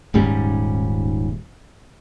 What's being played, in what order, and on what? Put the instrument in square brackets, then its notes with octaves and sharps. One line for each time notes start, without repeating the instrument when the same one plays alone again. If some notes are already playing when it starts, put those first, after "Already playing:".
[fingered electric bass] D#1 G#2 G3 C#4